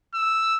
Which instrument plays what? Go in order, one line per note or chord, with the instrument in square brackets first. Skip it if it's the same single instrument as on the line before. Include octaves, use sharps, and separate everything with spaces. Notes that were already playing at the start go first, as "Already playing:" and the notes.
[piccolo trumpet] E6